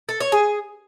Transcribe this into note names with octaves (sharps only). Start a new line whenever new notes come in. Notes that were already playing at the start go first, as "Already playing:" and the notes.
A4
C#5
G#4